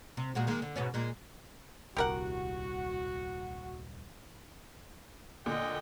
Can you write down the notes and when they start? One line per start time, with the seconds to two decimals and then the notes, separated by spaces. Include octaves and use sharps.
0.17 C3
0.35 A#2 G#3 F#4
0.47 D#3 G#3 A#3
0.62 D3
0.76 G#2 B2 C#4
0.94 A#2 G#3
1.97 D#1 C2 F#4 G4 A#4 F#5
5.46 A#2 D3 D#5 G5